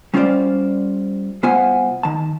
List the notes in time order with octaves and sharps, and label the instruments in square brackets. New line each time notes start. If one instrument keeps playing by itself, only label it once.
[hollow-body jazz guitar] G3 C#4 F4 G4 C5 D5
C2 B3 F4 C5 F#5 G#5
D#3 A5